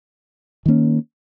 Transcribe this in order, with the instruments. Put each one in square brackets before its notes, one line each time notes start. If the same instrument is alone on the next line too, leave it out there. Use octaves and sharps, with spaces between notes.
[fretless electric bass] D#3 A#3 C#4